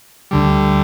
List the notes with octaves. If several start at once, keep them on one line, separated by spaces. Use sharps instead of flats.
D2 D3 G3